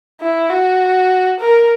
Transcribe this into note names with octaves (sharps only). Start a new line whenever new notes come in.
E4
F#4
A#4